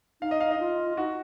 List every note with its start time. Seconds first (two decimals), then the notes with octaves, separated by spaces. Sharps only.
0.22 D#4 F5
0.31 D#5
0.41 F5
0.51 D#5
0.60 F4
0.97 D#4 F#4